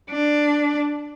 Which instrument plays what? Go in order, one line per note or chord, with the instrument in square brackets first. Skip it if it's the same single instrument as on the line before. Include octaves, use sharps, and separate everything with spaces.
[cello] D4